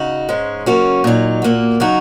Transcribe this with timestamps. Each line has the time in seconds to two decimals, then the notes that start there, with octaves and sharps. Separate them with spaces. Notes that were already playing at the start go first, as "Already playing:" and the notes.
Already playing: C#3 D#4 F#4
0.29 G#2 G#3 C#4
0.66 F#2 C#3 A#3 C#4 F#4
1.04 A#2 F#3 D#4
1.42 A#2 A#3 F#4
1.80 C#3 F#3 D#4 F#4